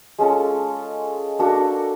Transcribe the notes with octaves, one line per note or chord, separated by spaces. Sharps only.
G#3 C#4 F4 A4
A#3 D4 F#4 A4